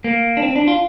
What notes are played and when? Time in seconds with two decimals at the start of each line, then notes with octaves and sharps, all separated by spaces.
0.04 A#3
0.37 D4
0.42 C4
0.56 D4
0.67 F4